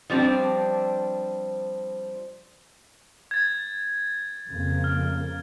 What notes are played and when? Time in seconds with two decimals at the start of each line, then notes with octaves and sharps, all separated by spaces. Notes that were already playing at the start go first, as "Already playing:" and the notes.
0.10 F3 G3 C4 D4
3.31 G#6 A6
4.48 F2 C#3 A#3
4.84 F6